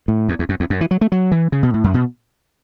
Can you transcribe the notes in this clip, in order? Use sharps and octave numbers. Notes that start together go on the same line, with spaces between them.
A2
E2
E2
F#2
E2
F#2
E3
F#3
A3
F#3
E3
C#3
B2
A2
F#2
B2